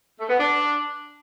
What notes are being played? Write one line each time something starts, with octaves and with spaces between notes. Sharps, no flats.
A3
B3
D4